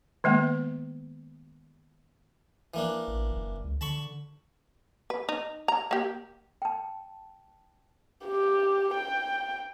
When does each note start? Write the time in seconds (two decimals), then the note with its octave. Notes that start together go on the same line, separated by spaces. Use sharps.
0.24 D#3 G#3 A#3 B3
2.74 E3 A#3 D4
3.08 A1
3.32 F#1
3.64 C#2
3.81 D3 A5 B5 C#6
5.10 B4
5.29 D#4
5.68 A#5
5.91 A#3 G4
6.62 G5 A5
8.26 G4
8.94 G5